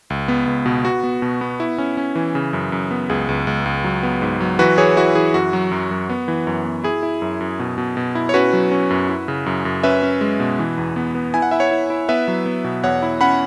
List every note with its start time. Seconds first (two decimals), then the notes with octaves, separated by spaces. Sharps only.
0.10 C#2
0.28 B3
0.47 C#2
0.66 B2
0.85 B3 F#4
1.04 B3
1.22 B2
1.41 B3
1.60 E4
1.78 C#4
1.97 C#4
2.15 E3
2.35 C#3
2.53 F#2
2.72 F#2
2.91 B3
3.10 C#2 G#4
3.29 C#2
3.47 C#2
3.66 C#2
3.84 F#3
4.03 B3
4.22 G#2
4.41 F#3
4.59 E3 F#4 B4
4.78 E3 G#4 C#5
4.97 E4 F#4
5.15 E3 G#4
5.34 F#2 F#4
5.53 F#3
5.71 F#2
5.91 F#2
6.09 B3
6.28 E3
6.47 F#2
6.65 B3
6.84 E4 G#4
7.03 E4
7.22 F#2
7.41 F#2
7.59 B2
7.78 B2
7.97 B2
8.15 E4
8.29 C#5
8.34 C#4 F#4 B4
8.53 F#3
8.71 C#4
8.90 F#2
9.09 E4
9.28 C#3
9.46 F#2
9.65 F#2
9.83 C#4 B4 E5
10.03 C#4
10.21 G#3
10.40 B2
10.59 E3
10.78 E2
10.96 B3
11.15 B3
11.34 E4 G#5
11.42 F#5
11.51 E4 E5
11.60 C#5 F#5
11.71 E4
11.90 E4
12.09 B3 B4 E5
12.28 F#3
12.46 B3
12.64 B2
12.84 E2 C#5 F#5
13.02 E4
13.21 C#4 F#5 B5